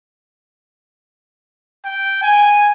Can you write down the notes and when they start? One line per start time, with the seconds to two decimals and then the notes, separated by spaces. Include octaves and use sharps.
1.85 G5
2.22 G#5